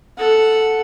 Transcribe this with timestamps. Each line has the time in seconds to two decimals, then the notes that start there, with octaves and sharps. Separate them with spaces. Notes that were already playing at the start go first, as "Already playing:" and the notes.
0.17 A4 F#5